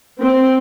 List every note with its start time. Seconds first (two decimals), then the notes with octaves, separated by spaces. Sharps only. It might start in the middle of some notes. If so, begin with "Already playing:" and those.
0.19 C4